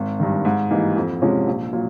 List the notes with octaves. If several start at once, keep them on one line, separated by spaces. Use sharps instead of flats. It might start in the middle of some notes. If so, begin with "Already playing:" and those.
Already playing: G#1
G2 D#3
G#2
E3 G3 A#3 D#4
F2
C3 F3 G#3 C#4
A#1
A#2 F#3